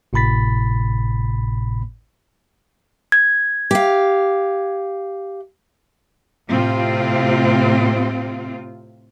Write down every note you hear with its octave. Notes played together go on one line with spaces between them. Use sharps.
G#1 A2 C3 B5 A6 B6
G#6
G4 F5
A2 C3 C4 F4